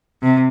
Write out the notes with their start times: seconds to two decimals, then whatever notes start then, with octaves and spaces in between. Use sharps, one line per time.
0.23 C3